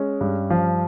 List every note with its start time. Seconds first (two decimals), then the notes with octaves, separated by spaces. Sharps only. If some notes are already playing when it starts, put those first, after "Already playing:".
Already playing: G#3 C#4
0.21 G2
0.50 F3